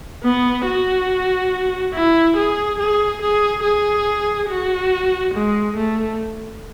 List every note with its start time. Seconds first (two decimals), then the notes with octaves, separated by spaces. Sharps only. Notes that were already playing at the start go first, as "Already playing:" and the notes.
0.24 B3
0.66 F#4
1.94 E4
2.37 G#4
2.79 G#4
3.22 G#4
3.64 G#4
4.49 F#4
5.34 G#3
5.77 A3